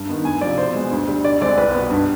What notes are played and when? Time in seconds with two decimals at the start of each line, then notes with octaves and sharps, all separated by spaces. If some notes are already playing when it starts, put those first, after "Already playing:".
Already playing: G2
0.09 D#3 B3
0.25 D2 G#5
0.41 C3 F3 D5
0.58 B2 C5
0.75 G#3 B3
0.91 D2
1.08 D3 G3
1.24 D2 D5
1.41 D3 G#3 C4 D5
1.58 C2 B4
1.75 B2 B3
1.90 G2